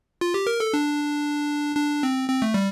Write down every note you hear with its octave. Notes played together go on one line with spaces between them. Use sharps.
F4
G4
A#4
A4
D4
D4
C4
C4
A3
G3